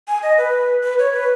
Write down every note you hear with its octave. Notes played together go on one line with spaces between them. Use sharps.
G#5
D#5
B4
B4
C#5
B4